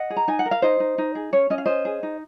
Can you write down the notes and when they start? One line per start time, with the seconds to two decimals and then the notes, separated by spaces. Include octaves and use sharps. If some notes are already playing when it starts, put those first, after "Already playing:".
Already playing: D#5 F#5
0.10 G#4
0.16 A#5
0.28 D#4 G#5
0.39 F#5
0.45 A#4
0.51 F5
0.62 D#4 C5 D#5
0.80 D#4
0.98 D#4
1.15 G#4
1.33 C#4 C#5
1.50 C#4 D#5
1.58 F5
1.66 C#4 C5 D#5
1.85 G#4
2.03 D#4